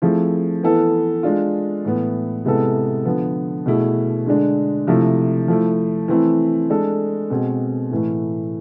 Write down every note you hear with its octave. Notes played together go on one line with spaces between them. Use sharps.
F3 A3 C4 E4 G#4
E3 B3 E4 A4
G#3 D4 F4
A2 E3 B3
C3 G#3 B3 E4 A4
D3 F3 B3
B2 A3 E4 G#4
D3 G#3 D4
C3 F3 A3 E4
F3 A3 E4
E3 A3 C4 E4 A4
G#3 D4 A4
B2 G#3 C4 G#4
A2 E3 A3